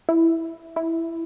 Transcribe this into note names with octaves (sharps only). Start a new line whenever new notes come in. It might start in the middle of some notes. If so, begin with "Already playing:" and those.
E4
E4